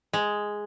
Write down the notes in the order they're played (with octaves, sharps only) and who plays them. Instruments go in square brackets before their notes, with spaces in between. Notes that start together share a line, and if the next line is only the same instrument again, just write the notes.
[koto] G#3